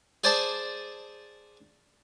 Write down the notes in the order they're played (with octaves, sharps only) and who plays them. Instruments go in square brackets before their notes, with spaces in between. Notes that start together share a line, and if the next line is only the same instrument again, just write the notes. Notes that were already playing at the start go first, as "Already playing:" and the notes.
[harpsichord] G#4 C5 D5 G#5 A5